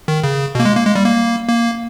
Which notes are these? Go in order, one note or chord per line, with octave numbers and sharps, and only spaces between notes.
D#3
C#3
B2
A#3
G#3
A#3
G#3
G3
A#3
A#3